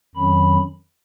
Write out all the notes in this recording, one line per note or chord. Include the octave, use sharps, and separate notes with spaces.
F2 D#3 F#3 C#4 B5